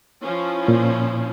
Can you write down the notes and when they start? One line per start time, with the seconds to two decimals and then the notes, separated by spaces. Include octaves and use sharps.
0.23 F3 C#4 E4
0.68 A#2